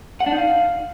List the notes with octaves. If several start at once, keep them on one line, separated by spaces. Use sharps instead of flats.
F#5
D4
D#4
F5